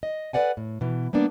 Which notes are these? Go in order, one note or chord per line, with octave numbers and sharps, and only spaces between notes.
D#5
A4 B4 C#5 D5 F#5 G#5
A2
B2 E3
G3 A#3 B3 D4